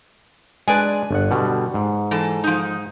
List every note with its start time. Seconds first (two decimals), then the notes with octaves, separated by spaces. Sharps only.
0.68 G#3 D4 B4 D5 G#5
1.11 G1 F#5
1.31 B2 D3 G3
1.74 G#2
2.11 E3 A4
2.44 F3 D#4